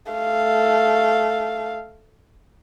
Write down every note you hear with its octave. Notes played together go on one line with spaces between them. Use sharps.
A3 F5